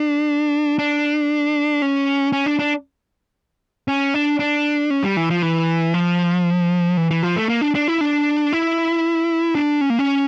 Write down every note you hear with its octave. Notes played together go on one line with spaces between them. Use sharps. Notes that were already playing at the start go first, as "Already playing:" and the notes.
Already playing: D4
D4
C#4
C#4
D4
D4
C#4
D4
D4
C#4
G3
E3
F3
E3
F3
E3
E3
F3
A3
A#3
D4
D4
E4
D4
E4
D4
C#4
A#3
C#4